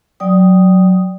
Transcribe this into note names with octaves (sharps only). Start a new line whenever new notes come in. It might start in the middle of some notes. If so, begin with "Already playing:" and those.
F#3 D5 G5 D#6